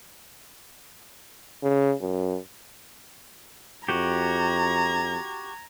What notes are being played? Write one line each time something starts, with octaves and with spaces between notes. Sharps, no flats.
C#3
F#2
F2 F#4 G4 A#5 G#6